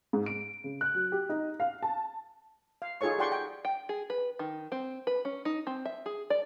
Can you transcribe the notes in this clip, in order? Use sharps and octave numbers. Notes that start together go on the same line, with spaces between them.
G#2
D7
C#3
F#6
F#3
G4
D#4
F5
A5
F5
D#4 F4 G#4 A4 C#5 C#6
G4 D5 F#5 G5 C6 C#6
G5
G5
G#4
B4
D#3
C4
B4
C#4
D#4
C4
E5
G#4
D5